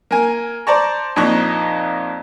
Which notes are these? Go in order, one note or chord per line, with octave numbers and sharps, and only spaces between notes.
A#3 G#5
C5 D5 A5 A#5 C#6
F2 A#2 D#4 A#5 C#6 F#6